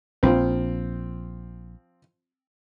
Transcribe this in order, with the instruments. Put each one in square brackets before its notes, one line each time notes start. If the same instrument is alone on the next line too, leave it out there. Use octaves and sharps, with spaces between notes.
[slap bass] A#1 [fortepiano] F3 C4